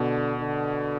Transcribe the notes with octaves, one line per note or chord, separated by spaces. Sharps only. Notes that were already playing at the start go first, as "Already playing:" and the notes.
Already playing: B2 D3
D3